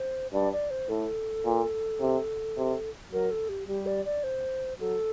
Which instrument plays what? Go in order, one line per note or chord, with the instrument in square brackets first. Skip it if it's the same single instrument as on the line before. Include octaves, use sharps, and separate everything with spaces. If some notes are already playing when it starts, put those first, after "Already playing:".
Already playing: [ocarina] C5
[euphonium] G2 [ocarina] D5
[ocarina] D5
C5
[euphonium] A2 [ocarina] A4
[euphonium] A#2
C3
C3
[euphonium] F#3 [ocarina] A#4
[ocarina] A4
G4
[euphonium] G3 [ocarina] G4
[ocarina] D5
D5
C5
[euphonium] F#3 [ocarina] A4